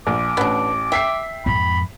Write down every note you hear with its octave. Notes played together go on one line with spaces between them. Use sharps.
A#1 D6
A1 B3 D4
E5 G5 B6 C7
F2 G#2 B5